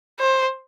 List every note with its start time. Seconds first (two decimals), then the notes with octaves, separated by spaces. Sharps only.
0.20 C5